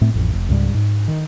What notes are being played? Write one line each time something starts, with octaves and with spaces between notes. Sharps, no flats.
A2 A3 C4
A1 F2
F1
C#2 G#2 G3
G#2
D#3